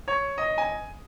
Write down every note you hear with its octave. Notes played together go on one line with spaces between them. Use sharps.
C#5
D#5
G#5